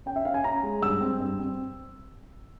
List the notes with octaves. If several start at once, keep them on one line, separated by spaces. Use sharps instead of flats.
C#4 G5
E5
C#4 F5
G#5
C#4 A#5
G#3
G2 E6
C4
G2
C4